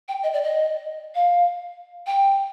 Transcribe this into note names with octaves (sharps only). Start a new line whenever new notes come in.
G5
D#5
D5
D#5
F5
G5